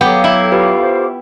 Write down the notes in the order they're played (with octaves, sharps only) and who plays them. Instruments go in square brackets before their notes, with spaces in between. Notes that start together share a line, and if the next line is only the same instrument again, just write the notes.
[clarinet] F#3 [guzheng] B3 G4 [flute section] A4 F5 D6 [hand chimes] G5
[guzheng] E4
[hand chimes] F4 G4 B4
[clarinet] C5